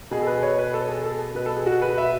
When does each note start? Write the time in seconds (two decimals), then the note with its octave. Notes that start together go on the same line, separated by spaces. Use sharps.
0.11 B2 G#4
0.22 A4
0.27 B4
0.43 C#5
0.58 B4
0.74 A4
0.89 G#4
1.04 A4
1.35 B2 B4
1.46 A4
1.56 G#4
1.66 F#4
1.82 B4
1.98 E5